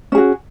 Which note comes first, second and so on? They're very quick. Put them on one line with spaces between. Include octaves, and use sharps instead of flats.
C#4 G#4 F#4